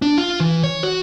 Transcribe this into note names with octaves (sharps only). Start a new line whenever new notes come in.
D4
F4
E3
C#5
F#4